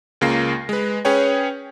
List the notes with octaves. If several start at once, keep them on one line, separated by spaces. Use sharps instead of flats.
C#2 C#3 A#3 F4 A#6 C7
G#3 B4
C#4 G#4 B4 C#5 G5